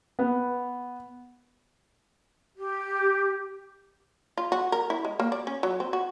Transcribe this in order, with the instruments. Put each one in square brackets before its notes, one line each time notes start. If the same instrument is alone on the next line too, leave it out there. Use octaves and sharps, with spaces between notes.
[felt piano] B3
[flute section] G4
[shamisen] F4
F#4
A#4
E4
G#3
A#3
D5
C#4
F#3
C4
F#4